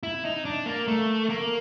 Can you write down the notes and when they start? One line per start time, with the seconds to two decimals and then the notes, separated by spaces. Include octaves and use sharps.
0.03 E4
0.25 D#4
0.45 D4
0.66 A#3
0.88 A3
1.29 A#3